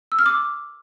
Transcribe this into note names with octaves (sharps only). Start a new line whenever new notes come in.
E6
F6
D6